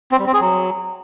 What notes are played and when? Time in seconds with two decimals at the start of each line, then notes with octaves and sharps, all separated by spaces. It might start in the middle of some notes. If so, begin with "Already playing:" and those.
0.12 C4
0.19 G3
0.26 C4
0.34 G#4
0.41 F#3